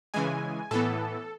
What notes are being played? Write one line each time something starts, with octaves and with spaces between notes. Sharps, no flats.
C#3 E3 G#3 G#5
A2 E3 B3 A4